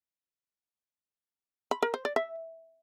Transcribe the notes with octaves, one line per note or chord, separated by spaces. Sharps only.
B5
A#4
C5
D5
E5